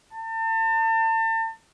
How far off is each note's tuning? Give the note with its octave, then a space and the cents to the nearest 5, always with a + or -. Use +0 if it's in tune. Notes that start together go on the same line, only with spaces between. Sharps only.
A5 +35